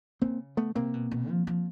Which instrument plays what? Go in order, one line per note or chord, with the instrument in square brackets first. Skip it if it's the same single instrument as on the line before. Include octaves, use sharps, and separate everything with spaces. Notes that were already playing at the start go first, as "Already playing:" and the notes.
[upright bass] C#3 [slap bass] A#3 C4
[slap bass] A3 B3
[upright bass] C3 [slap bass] A#3 C4
[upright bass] B2
B2
F3
F3